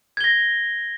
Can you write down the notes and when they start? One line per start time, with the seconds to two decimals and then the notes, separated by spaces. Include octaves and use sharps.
0.17 G#6
0.21 G7
0.24 A#6